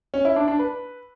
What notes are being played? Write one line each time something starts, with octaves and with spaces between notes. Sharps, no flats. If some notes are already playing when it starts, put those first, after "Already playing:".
C#4
E4
D4
D4
B4